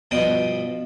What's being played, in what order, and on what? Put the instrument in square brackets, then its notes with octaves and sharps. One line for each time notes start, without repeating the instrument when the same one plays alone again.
[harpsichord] G2 B2 F3 G5 D#6